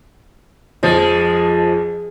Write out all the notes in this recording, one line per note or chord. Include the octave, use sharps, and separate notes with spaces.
F2 F3 G#3